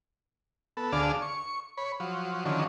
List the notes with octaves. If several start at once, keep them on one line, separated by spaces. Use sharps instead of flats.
B3 A4
D2 D3 G#4 D5 F5 A5
C#6
C#5 B5
F3 F#3
D3 D#3 F3 F#3 C#4